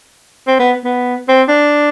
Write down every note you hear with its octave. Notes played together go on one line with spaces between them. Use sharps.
C4
B3
B3
C4
D4